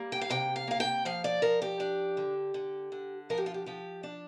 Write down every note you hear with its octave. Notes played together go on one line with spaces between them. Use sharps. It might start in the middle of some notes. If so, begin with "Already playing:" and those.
Already playing: G3 A#3
G5
F5
C3 G5
F5
A#3 F5
G5
F3 F5
D5
F3 A#4
G4
D4
D3
D3
D3
F3 A#4
G4
F4
G4
F3 G4
D4